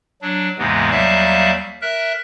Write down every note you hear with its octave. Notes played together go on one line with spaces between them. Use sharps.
F#3 D4
D#2 G#2 C3 E3 G#3 B3
D#2 F#3 G3 E5 F5 A5
A#4 E5 F#6